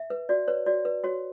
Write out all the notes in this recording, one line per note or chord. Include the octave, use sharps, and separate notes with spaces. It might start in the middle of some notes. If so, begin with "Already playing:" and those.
Already playing: E5
B4
F#4 D5
B4 C#5
F#4 D5
B4
F#4 C#5